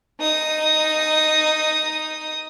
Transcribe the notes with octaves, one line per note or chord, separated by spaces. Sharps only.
D#4 D#6